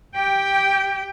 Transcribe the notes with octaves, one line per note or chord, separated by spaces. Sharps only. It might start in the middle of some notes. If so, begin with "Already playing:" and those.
G4 G5